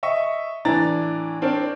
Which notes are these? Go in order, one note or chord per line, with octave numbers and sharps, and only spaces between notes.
D#5 E5 C#6
A2 E3 D4 D5 A#5 A6
C4 D4 A#4 C#5 D5